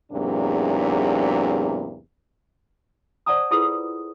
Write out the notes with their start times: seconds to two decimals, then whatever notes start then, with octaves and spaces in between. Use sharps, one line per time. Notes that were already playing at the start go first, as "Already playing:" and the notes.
0.12 E2 G#2 C3 F#3 A#3 D4
3.26 C5 D5 F#5 A5 A#5 D#6
3.51 E4 F4 G#4 A4 B4 D#6